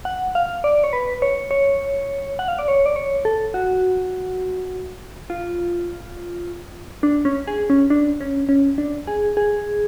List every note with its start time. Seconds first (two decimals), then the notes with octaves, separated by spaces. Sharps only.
0.05 F#5
0.35 F5
0.64 D5
0.84 C#5
0.93 B4
1.22 C#5
1.51 C#5
2.39 F#5
2.48 F5
2.59 D5
2.68 C#5
2.86 D5
2.96 C#5
3.25 A4
3.54 F#4
5.30 F4
7.03 D4
7.25 C#4
7.47 G#4
7.70 C#4
7.90 D4
8.21 C#4
8.49 C#4
8.78 D4
9.07 G#4
9.37 G#4